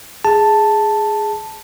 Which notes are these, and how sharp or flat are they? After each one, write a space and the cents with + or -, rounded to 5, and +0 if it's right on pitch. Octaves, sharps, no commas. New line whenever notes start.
G#4 +0 A5 +0